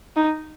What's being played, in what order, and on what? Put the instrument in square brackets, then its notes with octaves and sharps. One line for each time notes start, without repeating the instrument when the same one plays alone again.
[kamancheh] D#4